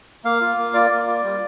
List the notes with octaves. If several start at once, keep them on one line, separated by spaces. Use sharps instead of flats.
A#3 F5
F4
A#3
F4 D5
A#3
F4
G3